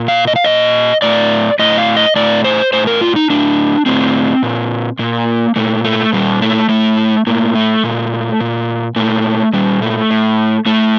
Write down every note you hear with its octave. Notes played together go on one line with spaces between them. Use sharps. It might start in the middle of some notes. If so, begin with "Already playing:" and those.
Already playing: A#2
F5
D#5
F5
A#2 D#5
A2 D5
A2 D#5
F5
D#5
A2 D5
C5
A2 C5
A#4
F4
D#4
A2 D4
A2 C4
A#2
A#2 A#3
A#2 A3
A3
A#2 G3
A3
A2 A3
A2 A#3
A3
A#2
A#2
A#2 A3
A#2 G3
A3
A2
A2 A3